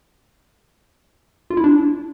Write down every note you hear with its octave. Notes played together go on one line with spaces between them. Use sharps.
F4
E4
D4